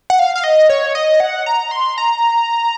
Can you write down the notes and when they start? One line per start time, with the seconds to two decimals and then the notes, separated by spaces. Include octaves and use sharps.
0.10 F#5
0.19 F5
0.35 F5
0.44 D#5
0.69 C#5
0.95 D#5
1.20 F#5
1.46 A#5
1.71 C6
1.98 A#5